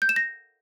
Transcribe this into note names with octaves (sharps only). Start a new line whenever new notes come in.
G6
E7
A#6